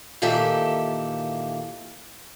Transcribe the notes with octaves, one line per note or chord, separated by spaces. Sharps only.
A#2 D#3 E3 G4 A4 E5